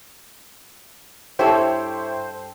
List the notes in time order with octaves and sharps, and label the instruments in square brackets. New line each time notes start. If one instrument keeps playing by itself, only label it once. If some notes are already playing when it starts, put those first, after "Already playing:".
[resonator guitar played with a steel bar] G2 A4 [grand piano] E4 G4 C#5 [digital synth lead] C5